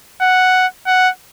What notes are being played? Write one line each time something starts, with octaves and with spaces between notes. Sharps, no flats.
F#5
F#5